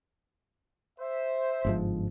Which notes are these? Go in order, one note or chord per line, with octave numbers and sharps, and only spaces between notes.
C5 E5
G1 G#2 F3